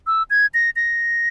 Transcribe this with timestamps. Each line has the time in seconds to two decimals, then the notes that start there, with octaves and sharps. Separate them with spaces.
0.07 E6
0.30 G#6
0.54 A#6
0.76 A#6